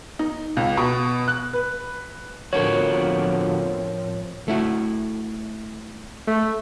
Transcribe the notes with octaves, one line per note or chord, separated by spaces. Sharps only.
D#4
C#2
B2
F#6
B4
A2 D3 F3 B3 C4 F#4 A#4 C#5
A3 E4 F#4
A3